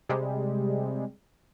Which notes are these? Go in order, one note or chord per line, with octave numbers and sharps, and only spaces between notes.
C3 G3 G#3